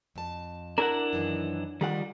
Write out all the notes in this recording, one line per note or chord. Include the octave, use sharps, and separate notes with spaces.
F2 A5
D4 E4 A#4 F#5
F#2 D#3 E3
D#3 G3 F4 G#4 A#4 F#5